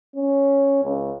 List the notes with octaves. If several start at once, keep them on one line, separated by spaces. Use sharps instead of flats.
C#4
C#2